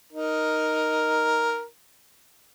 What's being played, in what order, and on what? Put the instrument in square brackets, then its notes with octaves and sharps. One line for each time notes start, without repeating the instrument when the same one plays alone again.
[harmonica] D#4 A#4